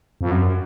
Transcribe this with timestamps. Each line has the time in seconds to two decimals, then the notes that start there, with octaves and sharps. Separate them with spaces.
0.21 F2
0.31 F#2